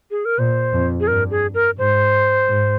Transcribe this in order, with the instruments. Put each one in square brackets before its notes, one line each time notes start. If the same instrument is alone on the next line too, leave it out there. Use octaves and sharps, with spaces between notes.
[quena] G#4
A#4
[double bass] A#2 [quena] C5
[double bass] F2
[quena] G#4
[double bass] G2 [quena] A#4
[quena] G#4
A#4
[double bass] G#2 [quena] C5
[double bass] G#2